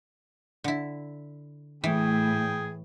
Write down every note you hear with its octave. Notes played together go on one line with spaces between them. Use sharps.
D3 E4
A2 E3 G#4 G5